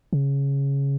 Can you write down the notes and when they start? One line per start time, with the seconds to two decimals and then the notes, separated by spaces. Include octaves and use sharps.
0.13 C#3